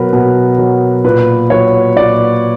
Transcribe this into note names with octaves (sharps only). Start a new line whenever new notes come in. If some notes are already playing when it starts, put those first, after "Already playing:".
Already playing: B2 F#3 A#4 B4
B2
F#3
A#2 B4
F#3 C#5
A#2 D5